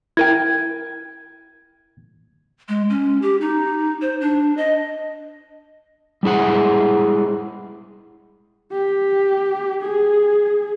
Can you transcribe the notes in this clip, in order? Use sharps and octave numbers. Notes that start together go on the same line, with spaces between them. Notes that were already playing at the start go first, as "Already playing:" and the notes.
E4 A#4 G5 G#6
G#3
C#4
G4
D#4
C5
D4
D#5
G3 G#3 E4 G#4 F#5
G4
G#4